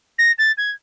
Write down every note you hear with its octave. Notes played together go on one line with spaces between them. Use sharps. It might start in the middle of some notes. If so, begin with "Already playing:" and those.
A#6
A6
G#6